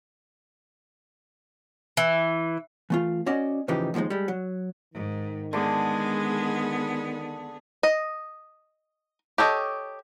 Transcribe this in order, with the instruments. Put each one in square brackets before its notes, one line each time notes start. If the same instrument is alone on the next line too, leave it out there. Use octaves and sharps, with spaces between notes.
[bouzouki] E3
[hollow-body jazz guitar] E3 A3 F4
C#4 F#4 D5 D#5
A2 C#3 E3 F3 D#4 G4
D#2 F3 F#3 G#3 D#4
G3 G#3
F#3
[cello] G#2 [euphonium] D#3
[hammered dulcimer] D3 D6 [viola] G#3 [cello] B3 G#4
[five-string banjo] D#5
G4 A4 C#5 D#5